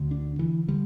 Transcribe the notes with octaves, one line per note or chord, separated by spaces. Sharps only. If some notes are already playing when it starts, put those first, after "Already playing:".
Already playing: D2 D3
D4
E3
D3 G3